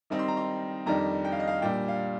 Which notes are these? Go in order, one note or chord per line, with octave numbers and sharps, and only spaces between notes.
D#3 G3 C4 D#4
C6
A#5
C6
F2 D#3 G3 D4 A#5
G5
F5
D#5
F5
A#2 G3 D4 G5
F5